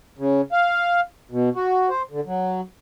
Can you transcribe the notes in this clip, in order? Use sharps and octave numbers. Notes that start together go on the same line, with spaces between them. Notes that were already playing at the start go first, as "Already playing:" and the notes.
C#3
F5
B2
F#4
C5
D3
F#3